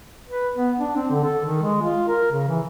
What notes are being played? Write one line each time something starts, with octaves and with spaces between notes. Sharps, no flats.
B4
B3
D4
C4
D3
A4
D#3
G#3
F4
A#4
C#3
E3